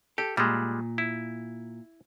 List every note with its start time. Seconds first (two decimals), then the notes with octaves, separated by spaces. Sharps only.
0.18 G4 A4
0.37 A#2 G3 G#3
0.98 E4